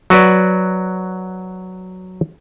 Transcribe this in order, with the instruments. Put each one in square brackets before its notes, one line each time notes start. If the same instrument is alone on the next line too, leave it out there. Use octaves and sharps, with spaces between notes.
[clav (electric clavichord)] F#3 F#4 B4 D5